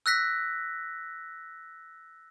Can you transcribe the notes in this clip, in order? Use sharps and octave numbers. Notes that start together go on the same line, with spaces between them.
E6 F#6 A#6 B6